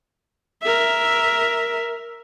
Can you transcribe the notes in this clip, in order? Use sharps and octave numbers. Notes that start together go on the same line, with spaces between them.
A#4 E5